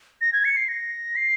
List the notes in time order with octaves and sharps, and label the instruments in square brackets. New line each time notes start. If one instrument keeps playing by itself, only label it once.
[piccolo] A#6
G#6
C#7
C7
A#6
C7